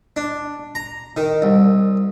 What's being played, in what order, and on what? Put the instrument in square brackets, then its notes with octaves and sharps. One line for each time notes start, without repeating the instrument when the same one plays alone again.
[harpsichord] D4
A#5
D#3
C2